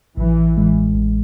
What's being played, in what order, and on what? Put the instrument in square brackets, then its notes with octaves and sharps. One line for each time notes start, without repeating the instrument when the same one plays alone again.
[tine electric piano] A1 [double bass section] E3
[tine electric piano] A2 G#3
A1